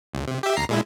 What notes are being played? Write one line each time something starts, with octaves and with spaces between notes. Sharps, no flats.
C#2
C3
G4 E5
D2 A#5 C7
A#2 G#3 E4